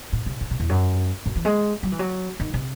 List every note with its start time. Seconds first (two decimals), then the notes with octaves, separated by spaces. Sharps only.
0.13 A2
0.26 C3
0.41 C#3
0.51 C3
0.60 E2
0.69 F#2
1.26 F#2
1.36 E3
1.45 G#3
1.83 F#3
1.92 E3
1.99 F#3
2.40 D#3
2.54 C3